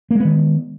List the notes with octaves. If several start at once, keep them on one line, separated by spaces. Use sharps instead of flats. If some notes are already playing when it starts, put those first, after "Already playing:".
D#3 G#3 A#3 B3